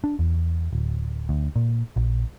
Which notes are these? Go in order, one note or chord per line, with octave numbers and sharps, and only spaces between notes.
D4
E2
D1
D2
A#2
A#1